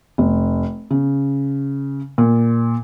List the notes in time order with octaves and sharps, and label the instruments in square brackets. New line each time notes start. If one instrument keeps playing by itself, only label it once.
[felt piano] F1
C#3
A#2